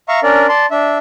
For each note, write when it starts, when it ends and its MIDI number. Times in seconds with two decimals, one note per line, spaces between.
0.09 0.20 76
0.09 0.20 77
0.09 0.20 82
0.09 0.20 85
0.23 0.47 61
0.23 0.47 62
0.23 0.47 70
0.23 0.47 74
0.49 0.66 74
0.49 0.66 81
0.49 0.66 84
0.71 0.98 62
0.71 0.98 76